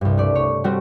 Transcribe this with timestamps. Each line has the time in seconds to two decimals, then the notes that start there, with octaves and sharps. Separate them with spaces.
0.01 C2 G2
0.18 A3 D5
0.35 C#5
0.64 G3 A3 C4 F#4